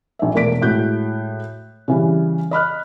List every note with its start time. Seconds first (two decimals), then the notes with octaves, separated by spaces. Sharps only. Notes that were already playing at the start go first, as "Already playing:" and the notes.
0.19 A#1 E5
0.34 E1 A3 A#4 D5 B6 D7
0.62 A2 G#3 F#4 F#6 G6
1.88 C#3 E3 G3
2.51 D#5 B5 F6 F#6